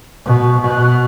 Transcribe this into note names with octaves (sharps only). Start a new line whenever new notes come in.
B2
B2